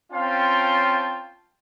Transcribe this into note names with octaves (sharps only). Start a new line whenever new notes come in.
C4 C#4 F4 F5 G5 A5